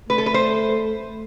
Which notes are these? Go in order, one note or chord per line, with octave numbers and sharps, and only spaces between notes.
A3 B4
A4
B4
C5